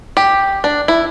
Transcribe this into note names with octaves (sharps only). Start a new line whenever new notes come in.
G4
D4
E4